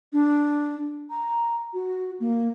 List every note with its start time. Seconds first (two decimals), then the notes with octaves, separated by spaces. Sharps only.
0.13 D4
1.10 A#5
1.73 F#4
2.20 A#3